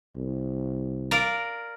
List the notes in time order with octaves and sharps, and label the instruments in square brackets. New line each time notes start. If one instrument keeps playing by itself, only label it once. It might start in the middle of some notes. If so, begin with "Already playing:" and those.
[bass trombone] C2
[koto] A#4 D5 F5